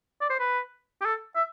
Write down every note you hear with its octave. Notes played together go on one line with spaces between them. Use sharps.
D5
C5
B4
G4
A4
E5